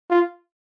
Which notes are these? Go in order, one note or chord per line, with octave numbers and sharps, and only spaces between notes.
F4